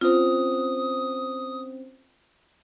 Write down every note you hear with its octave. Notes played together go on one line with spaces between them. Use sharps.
C4 C#4 F4 C5 D#6